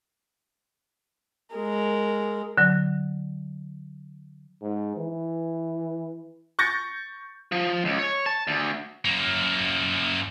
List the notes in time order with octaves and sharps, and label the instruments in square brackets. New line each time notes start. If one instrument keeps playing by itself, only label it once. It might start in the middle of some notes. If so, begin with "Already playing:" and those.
[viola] G#3 A#4
[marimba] D3 F#3
[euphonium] G#2
E3
[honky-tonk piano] C#6 G6 A6 A#6 C#7
[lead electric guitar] F3
C#2
C#5
A5
D2
[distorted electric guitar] F#2 A#3